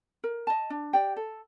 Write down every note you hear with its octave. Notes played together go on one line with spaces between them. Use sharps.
A#4
D#5 A5
D4
G4 D5 G5
A4